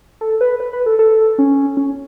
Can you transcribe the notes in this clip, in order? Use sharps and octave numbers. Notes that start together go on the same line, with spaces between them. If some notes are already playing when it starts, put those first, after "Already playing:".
A4
B4
B4
B4
A4
A4
C#4
C#4